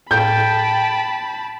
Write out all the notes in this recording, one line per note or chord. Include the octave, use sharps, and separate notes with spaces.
A2 A4 G5 A5 B5 G6